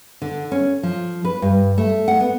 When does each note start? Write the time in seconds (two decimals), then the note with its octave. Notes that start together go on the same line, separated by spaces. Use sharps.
0.22 D3
0.52 C#4
0.83 F3
1.25 B4
1.42 G2
1.78 A3
2.08 F#5
2.20 B3